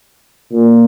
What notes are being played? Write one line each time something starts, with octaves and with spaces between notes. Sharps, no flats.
A#2